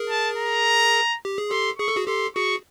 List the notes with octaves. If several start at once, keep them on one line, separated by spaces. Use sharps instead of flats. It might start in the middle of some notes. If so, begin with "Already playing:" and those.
Already playing: G#4 A#4
A5
A#5
G4
G#4
G4 A4 C6
G#4 C#6
A4
F#4 G#4
G4 A4 C6
F#4 G#4 C#6